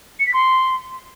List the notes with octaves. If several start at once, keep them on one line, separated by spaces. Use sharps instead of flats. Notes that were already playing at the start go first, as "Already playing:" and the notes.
C#7
B6
C6